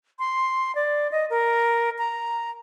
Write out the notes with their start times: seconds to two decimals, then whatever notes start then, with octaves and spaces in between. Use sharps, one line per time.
0.19 C6
0.75 D5
1.12 D#5
1.30 A#4
1.98 A#5